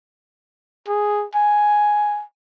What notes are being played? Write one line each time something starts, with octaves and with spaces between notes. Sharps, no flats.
G#4
G#5